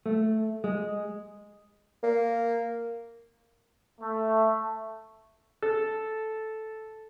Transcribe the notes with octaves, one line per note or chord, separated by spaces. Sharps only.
A3
G#3
A#3
A3
A4